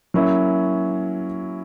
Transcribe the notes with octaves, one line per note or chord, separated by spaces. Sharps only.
F#3 A#3 C#4 E4